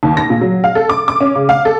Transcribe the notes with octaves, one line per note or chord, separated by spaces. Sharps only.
D#2
A#6
A#2
F#3
F5
A4
D6
D6
C#4
C#3
F5
A4